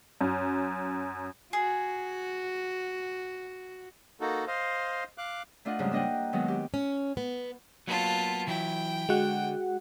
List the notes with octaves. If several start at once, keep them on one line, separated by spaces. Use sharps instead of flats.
F#2
F#4 G#4
A#3 D#4 F#4 A4
C5 D#5 F5
F5 D6 F#6
A3 D4 F4 D#5 F#5
F2 G#2 C#3 G3 F4
A#3 D4 D#5 F#5 G5
D#3 F#3 G#3 B3 D#4
G4
C#4
B3
F#3 A#3 B3 F4 A5
E3 F#3 E4 G5
D3 G#3 F#4 F#5